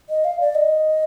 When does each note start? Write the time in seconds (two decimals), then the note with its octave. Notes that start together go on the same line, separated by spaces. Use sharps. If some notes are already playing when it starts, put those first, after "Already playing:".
0.10 D#5
0.25 F5
0.40 D5
0.55 D#5